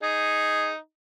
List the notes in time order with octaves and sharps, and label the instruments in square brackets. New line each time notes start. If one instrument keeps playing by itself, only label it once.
[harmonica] D#4 [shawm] G#4